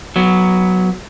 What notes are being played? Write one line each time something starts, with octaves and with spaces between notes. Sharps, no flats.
F#3 B3